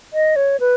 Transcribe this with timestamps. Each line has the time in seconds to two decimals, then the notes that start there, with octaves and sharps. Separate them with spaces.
0.13 D#5
0.36 C#5
0.60 B4